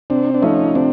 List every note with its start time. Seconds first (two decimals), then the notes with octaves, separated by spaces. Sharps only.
0.10 C3 C4 D4
0.34 D4
0.42 F3 A3 C#4 D#4
0.75 C3 C4 D4